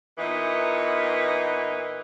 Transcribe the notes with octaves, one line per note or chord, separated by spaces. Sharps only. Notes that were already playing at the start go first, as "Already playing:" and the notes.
A#2 E3 B3 D#4